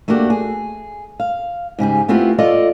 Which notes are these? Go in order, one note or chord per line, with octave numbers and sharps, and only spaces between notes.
A3 A#3 D4 F#4 G4
G#4
F5
G#2 C#3 G4 G#4
A3 B3 C4 E4 F4 G4
F4 A4 D5 D#5 F5